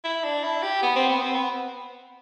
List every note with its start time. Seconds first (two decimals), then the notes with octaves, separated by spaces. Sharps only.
0.04 E4
0.24 D4
0.44 E4
0.62 G4
0.82 B3
0.96 C4
1.09 B3
1.21 C4
1.35 B3